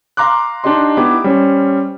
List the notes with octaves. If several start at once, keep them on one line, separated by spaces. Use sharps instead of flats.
F5 A#5 C6 D6 F#6
D4 D#4 G4 D#5 C6
B3 D#4 E4 G4 D6
G3 C#4 C5